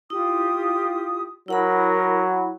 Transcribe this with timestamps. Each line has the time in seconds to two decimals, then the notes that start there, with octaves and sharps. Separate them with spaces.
0.10 E4 F4 G4 D#6
1.48 F#3 E4 A#4 F#5 B5